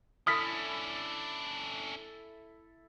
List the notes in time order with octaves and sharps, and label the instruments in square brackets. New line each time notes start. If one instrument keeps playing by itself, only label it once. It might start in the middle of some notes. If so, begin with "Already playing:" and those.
[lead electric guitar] C#4 D4 [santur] E4 A4 [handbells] D#6 F6 B6